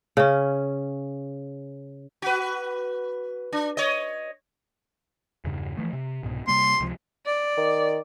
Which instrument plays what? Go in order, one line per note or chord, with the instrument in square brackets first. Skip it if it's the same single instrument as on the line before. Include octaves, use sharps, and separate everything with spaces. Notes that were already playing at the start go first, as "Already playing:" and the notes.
[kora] C#3 C#4
[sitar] F#4 B4
D4
C#5 D#5
[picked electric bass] E2 G2 C#3
E3 F3 A3
C3
C2 G#2 B2
[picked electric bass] C3 G3 A#3 [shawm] C6
[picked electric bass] C#2 C3 F3
[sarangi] D5
[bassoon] D#3